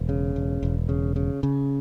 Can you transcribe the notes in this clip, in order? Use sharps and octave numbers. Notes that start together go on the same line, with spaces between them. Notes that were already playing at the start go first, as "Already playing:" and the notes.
Already playing: E1
C#3
E1
E1
C#3
C#3
C#3